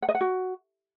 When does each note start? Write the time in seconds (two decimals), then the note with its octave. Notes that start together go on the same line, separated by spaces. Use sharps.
0.02 F#5
0.09 D#5
0.15 F#5
0.21 F#4